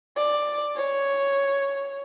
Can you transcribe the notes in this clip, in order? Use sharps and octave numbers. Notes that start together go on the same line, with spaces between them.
D5
C#5